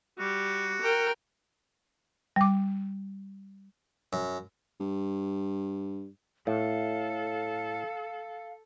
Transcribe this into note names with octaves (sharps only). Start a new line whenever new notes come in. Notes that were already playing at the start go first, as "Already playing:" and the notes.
G3 F#4
A#4 G5
G3 D6
F#2
G2
A2 A4 F5